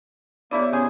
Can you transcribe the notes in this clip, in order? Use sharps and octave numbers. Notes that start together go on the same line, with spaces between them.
A#3 B3 D4 E4 G4 C#5 E5
C#3 G#4 C5 G#5